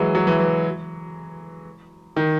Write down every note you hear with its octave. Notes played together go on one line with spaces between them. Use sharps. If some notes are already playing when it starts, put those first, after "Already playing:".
Already playing: E3 F#3 G#3
F#3
E3
E3
D#3